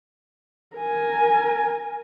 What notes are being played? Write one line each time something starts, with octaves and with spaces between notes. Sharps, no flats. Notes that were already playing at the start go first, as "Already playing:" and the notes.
A#4 G#5